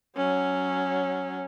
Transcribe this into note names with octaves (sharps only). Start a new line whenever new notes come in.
F#3 C#4